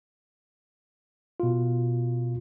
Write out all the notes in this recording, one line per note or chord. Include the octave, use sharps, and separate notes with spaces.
B2 F4